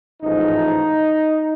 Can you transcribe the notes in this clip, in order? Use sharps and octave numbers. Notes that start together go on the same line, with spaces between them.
A1 G#2 F3 G#3 D#4